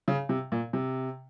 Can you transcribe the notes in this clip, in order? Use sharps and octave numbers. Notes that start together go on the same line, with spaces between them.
C#3
C3
A#2
C3